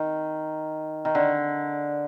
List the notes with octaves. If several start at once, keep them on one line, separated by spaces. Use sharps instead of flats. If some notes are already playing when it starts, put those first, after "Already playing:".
Already playing: D#3
D#3
D3